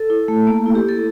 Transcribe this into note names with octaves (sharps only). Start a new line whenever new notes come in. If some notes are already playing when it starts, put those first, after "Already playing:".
Already playing: A4
E4
A3
A#3
E4
G4
E4 A4